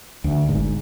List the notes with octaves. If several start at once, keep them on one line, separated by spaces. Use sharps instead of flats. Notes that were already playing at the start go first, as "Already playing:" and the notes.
D2
G1 G#2